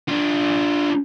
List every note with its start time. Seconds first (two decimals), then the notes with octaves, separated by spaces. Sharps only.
0.09 D4 F4